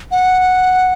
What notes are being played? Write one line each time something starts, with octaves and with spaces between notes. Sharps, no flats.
F#5